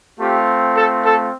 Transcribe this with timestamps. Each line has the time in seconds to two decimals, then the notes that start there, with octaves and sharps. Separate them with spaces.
0.18 A3 C4 F4 G4
0.75 A4
1.04 A4